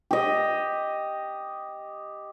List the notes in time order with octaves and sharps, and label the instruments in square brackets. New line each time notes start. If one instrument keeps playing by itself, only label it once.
[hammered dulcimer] G4 D#5